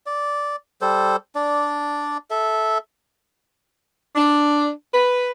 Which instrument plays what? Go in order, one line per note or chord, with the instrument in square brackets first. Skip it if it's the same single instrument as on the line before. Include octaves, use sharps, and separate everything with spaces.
[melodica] D5
G3 A4 C5
D4 D5
A4 E5
[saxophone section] D4
B4